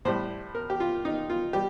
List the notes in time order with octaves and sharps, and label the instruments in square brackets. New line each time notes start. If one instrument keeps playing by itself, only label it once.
[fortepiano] A2 G3 C5
A#4
G4
F4
D#4
F4
G3 G4